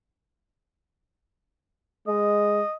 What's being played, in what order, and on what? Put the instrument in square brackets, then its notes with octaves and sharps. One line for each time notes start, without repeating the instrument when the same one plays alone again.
[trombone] G#3 [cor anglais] D#5